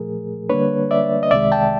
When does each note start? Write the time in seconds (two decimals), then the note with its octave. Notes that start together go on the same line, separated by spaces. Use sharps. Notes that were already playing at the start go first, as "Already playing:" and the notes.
Already playing: A#2 F3 A3 G#4 A#4
0.49 D3 G3 A#3 D4 B4 C#5
0.91 D5 E5
1.23 D#5
1.31 C2 C3 D#3 G#3 D5 E5
1.52 G5 A5